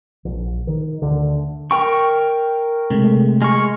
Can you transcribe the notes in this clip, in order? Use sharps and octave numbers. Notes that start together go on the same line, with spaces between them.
A#1
D#3
D2 D3
A#4 G5 C#6
C3 G#3 A3
G#3 C#6 F6